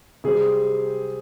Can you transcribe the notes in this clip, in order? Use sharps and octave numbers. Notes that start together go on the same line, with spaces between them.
C3 G3 C4 G#4